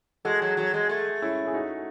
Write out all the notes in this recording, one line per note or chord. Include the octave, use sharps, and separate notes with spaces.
G#3 F#4 A4
F#3
F#3
G#3
A3
C#4 E4
G#4
D#4 F#4